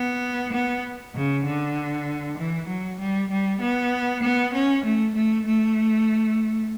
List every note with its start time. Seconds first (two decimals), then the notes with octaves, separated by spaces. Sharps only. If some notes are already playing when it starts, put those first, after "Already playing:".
Already playing: B3
0.53 B3
1.15 C#3
1.46 D3
2.38 E3
2.68 F#3
2.99 G3
3.31 G3
3.61 B3
4.22 B3
4.54 C#4
4.84 A3
5.15 A3
5.46 A3